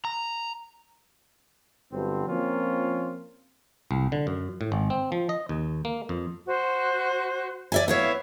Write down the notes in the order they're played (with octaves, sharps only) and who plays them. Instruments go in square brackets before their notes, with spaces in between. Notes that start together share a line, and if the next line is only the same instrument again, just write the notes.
[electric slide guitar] A#5
[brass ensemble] G1 G2 F#3 C4
F3 A#3 C4 C#4 F4
[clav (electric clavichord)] C2
D3
F#2
A2
G#1
C4
F3
D#5
D#2
A#3
F2
[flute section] F#4 C5
[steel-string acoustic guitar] D5 E5 G#5
[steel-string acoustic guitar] B3 E4 C#5 [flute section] E5 F5